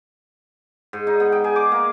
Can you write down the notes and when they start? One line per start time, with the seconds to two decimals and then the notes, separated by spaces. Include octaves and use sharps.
0.93 G#2
1.07 D#4
1.20 B3
1.32 G5
1.44 G#4
1.56 D6
1.72 A#3